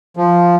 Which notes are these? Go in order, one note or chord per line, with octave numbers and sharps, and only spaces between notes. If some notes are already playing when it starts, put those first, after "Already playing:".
F3